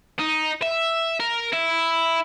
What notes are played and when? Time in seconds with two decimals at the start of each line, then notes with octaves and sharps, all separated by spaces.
0.19 D#4
0.62 E5
1.20 A#4
1.53 E4